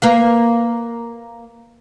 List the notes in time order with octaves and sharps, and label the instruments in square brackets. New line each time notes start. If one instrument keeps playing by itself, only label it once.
[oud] A#3 B4 F5